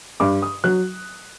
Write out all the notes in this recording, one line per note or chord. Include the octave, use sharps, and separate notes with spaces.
G2 D6
D#6
F#3 F#6